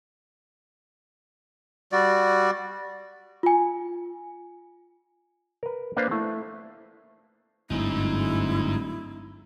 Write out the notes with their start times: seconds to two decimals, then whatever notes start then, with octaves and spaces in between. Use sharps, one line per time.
1.92 G3 F#4 D5
3.43 F4 G#5
5.63 A#4 B4
5.97 A#3 D4 B4 C5 F5 A#5
6.11 A3 E4
7.70 D1 G1 G#2 D#4 E4